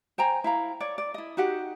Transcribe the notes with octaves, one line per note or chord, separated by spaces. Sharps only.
C5 G5 G#5 A#5
E4 F5 A#5
C#5 D5
D5
E4 D#5
D#4 F#4 G4 F#5